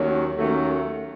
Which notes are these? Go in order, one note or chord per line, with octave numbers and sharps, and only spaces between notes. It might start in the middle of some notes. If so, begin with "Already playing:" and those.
Already playing: D#2 D#3 F#3 A3 C#4
D#2 D#3 F#3 A3 C#4